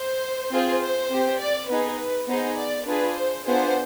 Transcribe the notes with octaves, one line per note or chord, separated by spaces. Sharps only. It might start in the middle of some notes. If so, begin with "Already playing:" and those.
Already playing: C5
C4 F4 G#4
C5
C4 G4
D5
B3 D#4 G#4 B4
B4
B3 D#4 G#4 C5
D5
D4 F4 G#4 B4
C5
B3 D4 F4 G#4 C5